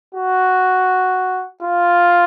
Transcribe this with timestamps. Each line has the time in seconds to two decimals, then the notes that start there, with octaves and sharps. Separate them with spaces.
0.14 F#4
1.62 F4